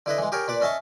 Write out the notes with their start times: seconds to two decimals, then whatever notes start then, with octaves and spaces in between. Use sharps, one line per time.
0.06 D3 E4 B4 D#5
0.18 E3 G#3
0.32 G4 G#4 A#4 C#5
0.48 A#2 B4 D5
0.61 C#4 D#5 E5 A5 C#6